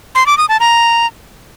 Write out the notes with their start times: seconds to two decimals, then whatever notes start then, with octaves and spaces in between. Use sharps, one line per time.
0.15 C6
0.26 D6
0.38 D#6
0.49 A5
0.60 A#5